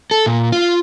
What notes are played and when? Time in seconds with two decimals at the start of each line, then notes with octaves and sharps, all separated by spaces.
0.11 A4
0.26 A#2
0.52 F4